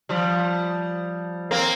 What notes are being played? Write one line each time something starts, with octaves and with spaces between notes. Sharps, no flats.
F3 G3
A#3 C4